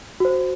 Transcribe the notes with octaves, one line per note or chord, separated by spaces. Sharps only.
F#4 C5